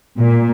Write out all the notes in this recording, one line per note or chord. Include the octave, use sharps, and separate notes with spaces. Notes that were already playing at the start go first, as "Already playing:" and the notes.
A#2